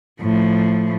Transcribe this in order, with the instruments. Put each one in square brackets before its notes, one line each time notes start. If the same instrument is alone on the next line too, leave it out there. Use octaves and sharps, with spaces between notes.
[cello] A2 F3